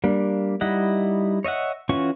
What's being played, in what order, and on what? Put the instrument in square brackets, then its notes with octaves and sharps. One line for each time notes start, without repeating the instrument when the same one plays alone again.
[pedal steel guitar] G3 A#3 D4
G3 D#4 E4 D#5 F#5
C#5 D#5 E5 F#5
E3 C#4 F4 F#4 C#6